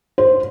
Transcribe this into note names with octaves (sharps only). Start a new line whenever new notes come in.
C5